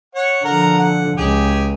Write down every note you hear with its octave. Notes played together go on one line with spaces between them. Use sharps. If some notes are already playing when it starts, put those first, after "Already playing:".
C#5 F#5
D3 F3 A#4 F#5 A#5
F#5
C#2 G4 G#4